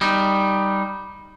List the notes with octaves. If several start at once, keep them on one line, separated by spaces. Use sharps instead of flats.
G3 D#4